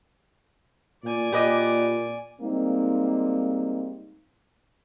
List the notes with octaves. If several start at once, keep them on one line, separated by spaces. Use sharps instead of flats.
A#2 D5 G#5
A#2 G4 B4 D#5
G3 G#3 A#3 C4 D#4